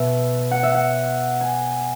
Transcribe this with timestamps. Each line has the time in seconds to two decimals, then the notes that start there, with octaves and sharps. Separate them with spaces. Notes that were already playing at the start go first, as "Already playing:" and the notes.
Already playing: B2 B3 E5
0.51 F#5
0.63 E5
0.75 F#5
1.41 G#5